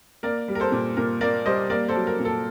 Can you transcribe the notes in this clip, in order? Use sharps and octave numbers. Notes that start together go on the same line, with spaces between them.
A#3 A#4 D5
G3
A#4
A4 C5
A#2
A#2 A#4
A#3 A#4 D5
G3 C5 D#5
A#3 A#4 D5
A4 C5
F#3
A#4
A#2
A4